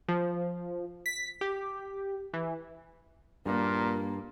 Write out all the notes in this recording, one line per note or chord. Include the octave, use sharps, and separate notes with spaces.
F3
B6
G4
E3
G2 A#2 A#3